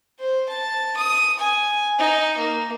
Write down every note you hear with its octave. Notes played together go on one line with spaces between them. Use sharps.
C5
A5
D#6
G#5
D#4
A#3